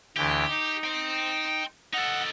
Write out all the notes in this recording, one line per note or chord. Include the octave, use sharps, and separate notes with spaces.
D2 E3 G4
D#4
G5 C6
D#4 A4 F#5